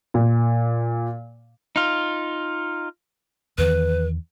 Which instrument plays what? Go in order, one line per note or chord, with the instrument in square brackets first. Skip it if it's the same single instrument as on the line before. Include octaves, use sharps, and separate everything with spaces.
[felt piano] A#2
[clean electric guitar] D#4 F4
[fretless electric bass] E2 D#3 E3 [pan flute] B4